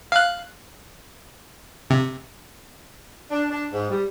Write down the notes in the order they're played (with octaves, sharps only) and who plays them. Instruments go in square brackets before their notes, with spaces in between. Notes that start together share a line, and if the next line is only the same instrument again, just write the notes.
[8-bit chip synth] F5 F#6
C3
[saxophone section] D4
D4
G#2
G3